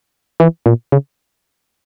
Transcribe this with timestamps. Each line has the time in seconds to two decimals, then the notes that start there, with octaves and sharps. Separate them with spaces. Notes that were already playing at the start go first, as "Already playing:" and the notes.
0.40 E3
0.66 A#2
0.92 C#3